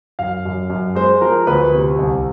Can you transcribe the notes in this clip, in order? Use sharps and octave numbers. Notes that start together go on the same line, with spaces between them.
F#2 F5
F#2
F#2
G#3 C5
F3 A#4
D2 B4
C3
C2